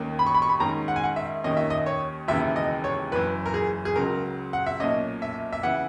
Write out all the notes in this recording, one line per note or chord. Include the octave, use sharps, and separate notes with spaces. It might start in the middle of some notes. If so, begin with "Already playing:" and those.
Already playing: D#2 D#3 A#3 C#4
B5
C#6
B5
C#6
B5
G#2 D#3 G#3 C#4 A#5
F#5
G#5
F#5
E5
D#2 D#3 A#3 C#4 D#5
E5
D#5
C#5
E1 D#2 C#3 E3 E5
D#5
C#5
F#1 F#2 E3 B4
A#4
G#4
G#4
C#2 C#3 F#3 A#4
F#5
E5
B1 A#2 A#3 C#4 D#5
E5
E5
C#3 E3 F#5